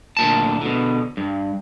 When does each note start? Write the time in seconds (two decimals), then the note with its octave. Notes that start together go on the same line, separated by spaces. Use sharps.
0.17 D2 A#2 A5
0.61 B2 D3
1.17 G2